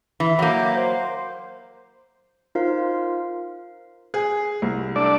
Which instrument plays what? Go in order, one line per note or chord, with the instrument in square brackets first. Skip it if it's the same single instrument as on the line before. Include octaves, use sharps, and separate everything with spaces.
[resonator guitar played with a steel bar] E3
[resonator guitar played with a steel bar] F#3 A#3 [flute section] E5 D6 G6
[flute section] C5
[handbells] D#4 F4 A#4 C5 F5
[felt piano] G#4
C2
[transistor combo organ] A3 D4 D5